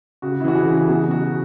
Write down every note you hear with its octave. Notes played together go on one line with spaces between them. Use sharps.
C#3 F#4
E4
E3 F#4
G#4
C#3
G#4
B2 F#4
F#3 F#4